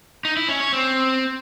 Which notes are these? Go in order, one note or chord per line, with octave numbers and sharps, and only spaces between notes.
D#4
E4
C#4
C#5
C4